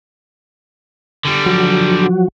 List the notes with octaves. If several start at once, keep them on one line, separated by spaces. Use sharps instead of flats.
D3 G3
F3 F#3 F#4